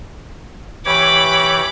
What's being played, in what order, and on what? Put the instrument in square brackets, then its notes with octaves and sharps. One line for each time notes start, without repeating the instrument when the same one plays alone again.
[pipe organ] E3 G4 C#5 [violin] B5 D6